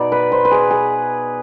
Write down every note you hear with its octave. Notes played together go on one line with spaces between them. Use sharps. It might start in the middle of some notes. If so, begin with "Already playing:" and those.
Already playing: B2 B3 D#4 D5
B4
C5
B4
G#4
G#4